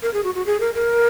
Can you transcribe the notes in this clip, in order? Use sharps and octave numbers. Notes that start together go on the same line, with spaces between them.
A#4
G#4
F#4
F#4
G#4
A#4
A#4